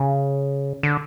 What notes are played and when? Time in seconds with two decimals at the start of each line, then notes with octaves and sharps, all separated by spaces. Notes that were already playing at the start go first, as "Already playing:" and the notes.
Already playing: C#3
0.83 D3